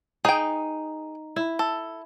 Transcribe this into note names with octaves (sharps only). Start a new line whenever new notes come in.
D#4 G#4 G5
E4
A4